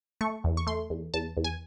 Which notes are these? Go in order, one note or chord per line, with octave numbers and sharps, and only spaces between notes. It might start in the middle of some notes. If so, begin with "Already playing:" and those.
A3 C#6
E2
C#6
A3 C6
E2
E2 A5
E2
G#5